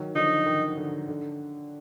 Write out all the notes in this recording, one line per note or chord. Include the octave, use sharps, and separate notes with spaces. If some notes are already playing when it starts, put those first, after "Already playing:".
Already playing: D#3 F#3
D3 F3 D#4
D#3
D3
D3